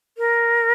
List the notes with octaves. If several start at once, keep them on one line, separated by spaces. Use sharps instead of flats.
A#4